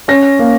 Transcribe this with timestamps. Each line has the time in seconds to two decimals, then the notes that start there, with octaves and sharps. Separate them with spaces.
0.08 C#4 A#6
0.39 A#3